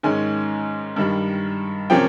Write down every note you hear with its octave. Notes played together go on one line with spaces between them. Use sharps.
G#2 D#3 G#3 C#4 G#5
G2 D#3 G3
C3 F3 A#3 C#4 G5